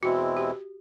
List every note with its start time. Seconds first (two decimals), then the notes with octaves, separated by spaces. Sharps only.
0.02 E2 B2 G#3 C4 E4 F#4
0.37 G4